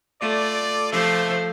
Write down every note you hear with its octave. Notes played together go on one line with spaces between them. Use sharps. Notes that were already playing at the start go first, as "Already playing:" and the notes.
A3 F4 A4 D5
C3 F3 A3 A4 C5